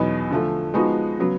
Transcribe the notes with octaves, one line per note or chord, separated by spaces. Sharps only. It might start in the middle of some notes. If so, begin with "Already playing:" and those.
Already playing: E2 B2 F#3 B3 D#4
D3 F3 A3
F3 G#3 B3 D#4 F#4
C#3 F#3 B3